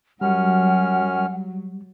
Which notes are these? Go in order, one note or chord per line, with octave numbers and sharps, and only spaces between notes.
F#2 F#3 G3 C#4 F#5 F6